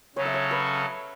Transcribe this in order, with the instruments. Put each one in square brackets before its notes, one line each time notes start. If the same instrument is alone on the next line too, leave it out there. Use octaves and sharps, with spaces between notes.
[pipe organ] C#3 F#3 C#4 A4 [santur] C#5
[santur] E5
C#5
B4